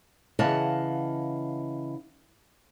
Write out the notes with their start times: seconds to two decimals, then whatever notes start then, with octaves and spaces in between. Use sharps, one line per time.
0.39 C#3 E3 D#5 F5 F#5 A5